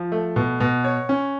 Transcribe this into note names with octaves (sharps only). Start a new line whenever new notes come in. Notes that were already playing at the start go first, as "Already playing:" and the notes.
Already playing: F3
A3
B2
B2
C#5
C#4